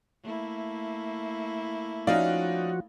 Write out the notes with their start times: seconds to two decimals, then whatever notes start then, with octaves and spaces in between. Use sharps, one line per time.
0.23 A3 A#3 E4
2.07 F3 C#4 D#4 F#4 D5 F5